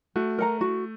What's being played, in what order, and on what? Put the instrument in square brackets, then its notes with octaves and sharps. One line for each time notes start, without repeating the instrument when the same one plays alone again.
[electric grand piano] A3 [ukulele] F#4
[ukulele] A#4 F#5 A#5
F#4